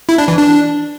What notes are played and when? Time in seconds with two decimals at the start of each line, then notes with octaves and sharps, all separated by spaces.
0.09 E4
0.18 D4
0.28 E3
0.38 D4